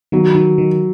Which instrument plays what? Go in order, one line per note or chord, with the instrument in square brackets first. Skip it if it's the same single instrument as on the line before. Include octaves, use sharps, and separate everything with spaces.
[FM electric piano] D#3 [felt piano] F#3
[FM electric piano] D#3
D#3